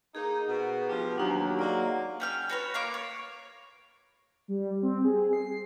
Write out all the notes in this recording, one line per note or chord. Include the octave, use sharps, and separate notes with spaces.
A#3 D#4 G#4
B2
D2 F3 B3 G4
D#2 F#3 D4 D#4
G#3 A#3 D5 D#5 F#5
C#4 G5 F6
F#4 B4 C#5
A#3 F5 C#6 D6
C#5
G3
C4
G#4
C7